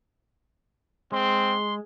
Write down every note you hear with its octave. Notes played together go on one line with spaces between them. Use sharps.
G#3 C4 C6